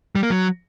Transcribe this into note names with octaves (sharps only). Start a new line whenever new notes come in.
G3
A#3
F#3